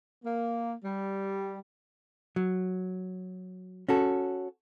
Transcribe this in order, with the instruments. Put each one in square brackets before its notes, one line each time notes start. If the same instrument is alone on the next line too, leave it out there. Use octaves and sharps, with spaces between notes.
[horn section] A#3
G3
[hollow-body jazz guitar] F#3
C#4 F#4 A4